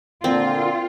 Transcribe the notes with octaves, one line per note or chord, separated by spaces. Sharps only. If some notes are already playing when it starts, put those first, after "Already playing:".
A#2 D3 C4 F4